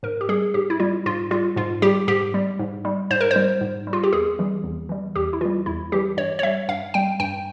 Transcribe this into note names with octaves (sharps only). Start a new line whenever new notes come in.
G#2 A#4
G4
G3 G#4
G#2 G4
E4
G3 F4
G#2 F4
G3 F4
G#2 F4
G3 G4
G#2 G4
G3
G#2
G3
G#2 C5
A#4
G3 C5
G#2
G3
F4
G4
E2 G#4
E3 G3
E2
E3 G3
E2 G4
E4
E3 G3 F4
E2 E4
E3 G3 G4
G2 C#5
C#5
G3 E5
G2 F5
G3 G5
G2 G5